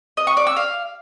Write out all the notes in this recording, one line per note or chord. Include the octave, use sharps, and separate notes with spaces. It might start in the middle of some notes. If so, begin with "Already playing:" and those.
D#5
C#6
D5
E6
F5